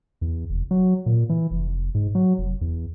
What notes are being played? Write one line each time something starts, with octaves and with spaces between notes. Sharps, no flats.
E2
F1
F#3
A#2
E3
F1
G#2
F#3
F1
E2